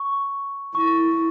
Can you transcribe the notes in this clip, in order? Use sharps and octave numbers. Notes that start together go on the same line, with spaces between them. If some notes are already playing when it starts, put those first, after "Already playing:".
Already playing: C#6
E4 C#6